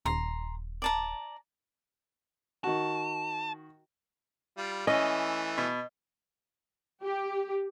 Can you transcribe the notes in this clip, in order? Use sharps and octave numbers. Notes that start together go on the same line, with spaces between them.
D#1 A#5 C6
D5 A5 A#5
D#3 F#4 A5
G3 F4
E3 A3 C#4 D#5
B2
G4